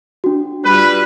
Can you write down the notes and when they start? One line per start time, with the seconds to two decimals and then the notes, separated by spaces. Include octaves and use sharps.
0.24 D4 F#4
0.65 G3 F4 B4 B5